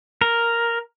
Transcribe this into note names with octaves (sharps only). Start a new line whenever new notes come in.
A#4